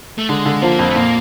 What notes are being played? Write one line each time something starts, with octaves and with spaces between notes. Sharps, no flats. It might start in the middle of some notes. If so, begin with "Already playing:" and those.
A3
D3 G#3
D3
F3 A#3
F2
A3
A#2 A#3